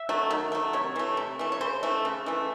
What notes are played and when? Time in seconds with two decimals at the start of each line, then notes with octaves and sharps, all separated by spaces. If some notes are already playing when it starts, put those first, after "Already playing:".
Already playing: E5
0.09 F#3 A3
0.31 D#3
0.52 F#3 A3
0.73 C3 C#5
0.96 E3 A3
1.17 C3
1.39 E3 A3
1.52 C#5
1.61 C#3 C5
1.83 E3 A3
2.05 C#3
2.26 E3 A3